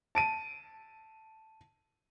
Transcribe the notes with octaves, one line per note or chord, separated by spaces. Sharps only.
A5 D7 D#7